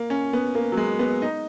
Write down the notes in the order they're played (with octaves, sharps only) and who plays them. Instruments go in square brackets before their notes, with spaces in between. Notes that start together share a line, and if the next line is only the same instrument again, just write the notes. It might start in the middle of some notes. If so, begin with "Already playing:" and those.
Already playing: [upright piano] A#3
C#4
B3
A#3
F#3
G#3
B3
D#4